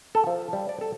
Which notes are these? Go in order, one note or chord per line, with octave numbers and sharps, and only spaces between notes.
A4
F3
G3
D5
A4